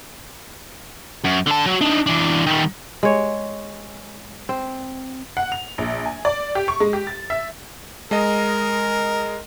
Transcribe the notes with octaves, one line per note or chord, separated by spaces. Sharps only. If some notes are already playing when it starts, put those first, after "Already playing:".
F#2
D3 A5
F#3
D4 D#4
E3 D4
D#3 G3
G#3 C#5
C4
F#5
F7
A#1
G#5
D5
G4
C#6
G#3
G4
A6
E5
G#3 A#4 D#5